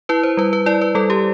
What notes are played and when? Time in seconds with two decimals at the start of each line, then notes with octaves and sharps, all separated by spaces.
0.09 E4 B4
0.23 C5
0.37 G3 B4
0.53 B4
0.66 E4 D5
0.81 B4
0.95 G3 A4
1.10 G4